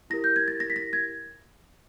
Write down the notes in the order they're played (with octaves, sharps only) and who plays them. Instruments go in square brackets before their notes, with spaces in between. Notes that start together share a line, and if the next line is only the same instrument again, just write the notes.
[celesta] E4 G4 A#4 A#6
G6
G#6
A6
A#6
B6
A#6
G#6